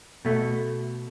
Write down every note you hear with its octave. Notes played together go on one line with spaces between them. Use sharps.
B2 A3